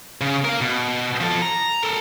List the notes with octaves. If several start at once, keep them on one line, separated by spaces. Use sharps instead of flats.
C#3
A#4 F5
B2
F3 A4
A#5
A4 A#4